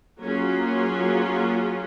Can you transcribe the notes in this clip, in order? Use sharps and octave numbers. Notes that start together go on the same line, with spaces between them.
F#3 A#3 C#4 F4 G#4